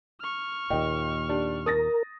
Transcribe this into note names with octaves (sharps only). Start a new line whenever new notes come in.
C#6 F6
D#2 A#2 D#5 G5
D4 G4 D5
A#4 D#6 A6 A#6